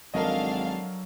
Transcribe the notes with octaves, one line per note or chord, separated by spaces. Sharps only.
G#1 F#3 D4 A4 A#4 D#5 F5